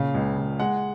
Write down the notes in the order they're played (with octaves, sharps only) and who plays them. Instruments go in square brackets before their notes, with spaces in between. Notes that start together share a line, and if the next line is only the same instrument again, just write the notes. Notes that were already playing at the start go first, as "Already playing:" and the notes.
Already playing: [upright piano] A#2 C#3 F5
C#2
C#2
G#3 F#5